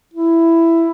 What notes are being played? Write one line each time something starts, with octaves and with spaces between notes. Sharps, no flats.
E4